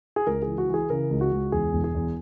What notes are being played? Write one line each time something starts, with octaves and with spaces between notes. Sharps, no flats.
G#4
C#2 A#4
E3 G#4
F#4
E3
G#4
C#3 A#4
C#2
F#4
C#2
E2 G#4
E1
G#4
E2